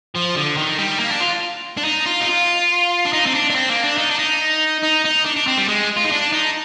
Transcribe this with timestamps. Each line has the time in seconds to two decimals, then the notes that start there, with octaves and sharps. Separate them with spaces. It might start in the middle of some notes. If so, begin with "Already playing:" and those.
0.15 F3
0.36 D3
0.57 D#3
0.78 G3
1.00 A#3
1.11 D4
1.20 F4
1.77 D4
1.84 D#4
2.06 F4
2.20 D#4
2.28 F4
3.05 D4
3.13 D#4
3.26 C4
3.35 D4
3.50 D4
3.55 C4
3.70 A#3
3.83 D4
3.98 D#4
4.11 D4
4.19 D#4
4.83 D#4
5.05 D#4
5.25 D4
5.36 D4
5.47 C4
5.58 G3
5.69 G#3
5.96 F4
6.04 D#4
6.11 D4
6.32 D#4